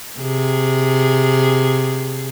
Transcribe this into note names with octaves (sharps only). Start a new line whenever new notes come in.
C3 G#4